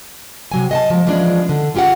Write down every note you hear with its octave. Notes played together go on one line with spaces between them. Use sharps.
C3 F#3 G#5
D#5 F#5 A5
F3 G#3
E3 F3 G#3 C#4 D4
D3
C#4 F4 G4 G#4 F#5